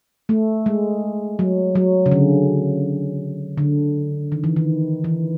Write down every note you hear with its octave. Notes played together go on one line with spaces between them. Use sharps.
A3
G#3
F#3
F#3
C#3
D3
D3
D#3
E3
D#3
E3